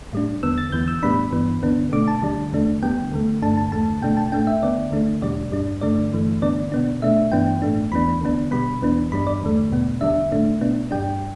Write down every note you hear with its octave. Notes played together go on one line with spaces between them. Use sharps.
A2 G3 D4
E2 D3 B3 E6
A6
E2 E3 B3 G6
E6
A2 G3 B3 D4 B5
G2 E3 B3
D2 D3 B3 D4
B2 A3 D4 D6
A5
D2 D3 G3 D4
E2 D3 A3 D4
D2 D3 G3 B3 G5
D2 D3 A3
G2 D3 A3 D4 A5
A5
E2 D3 A3 A5
B2 A3 D4 G5
A5
A2 A3 D4 G5
E5
D2 D3 B3 D5
D2 D3 A3 D4
E2 B2 G3 D4 D5
G2 G3 D4
G2 D3 A3 D4 D5
G2 E3 A3
D2 D3 B3 D4 D5
B2 B3 D4
B2 A3 D4 E5
G2 E3 B3 D4 G5
A2 A3 D4
E2 E3 B3 D4 B5
D2 D3 B3 D4
B2 G3 B3 B5
E2 E3 B3 D4
G2 G3 D4 B5
D5
E2 D3 A3
E2 B2 B3
D2 D3 G3 D4 E5
A2 A3 D4
B2 B3 D4
G2 G3 D4 G5